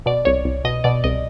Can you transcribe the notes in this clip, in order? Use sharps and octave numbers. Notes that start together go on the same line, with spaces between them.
B2 D5
C2 C#5
C2
B2 D#5
B2 D5
C2 D#5